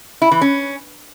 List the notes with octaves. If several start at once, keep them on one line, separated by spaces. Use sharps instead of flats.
E4
E3
C#4